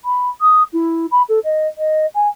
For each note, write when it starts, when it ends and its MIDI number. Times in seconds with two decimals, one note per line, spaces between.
0.05 0.29 83
0.41 0.63 87
0.73 1.06 64
1.11 1.22 83
1.29 1.39 69
1.44 1.67 75
1.78 2.06 75
2.14 2.28 80